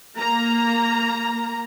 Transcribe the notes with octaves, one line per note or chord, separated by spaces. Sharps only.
A#3 A#5